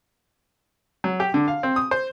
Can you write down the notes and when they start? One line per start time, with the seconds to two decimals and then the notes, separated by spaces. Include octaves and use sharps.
1.04 F#3
1.20 G4
1.34 D3
1.48 F5
1.63 C4
1.76 D#6
1.91 C5